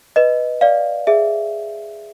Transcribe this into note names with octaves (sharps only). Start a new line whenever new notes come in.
B4 D#5
D5 F5
G#4 E5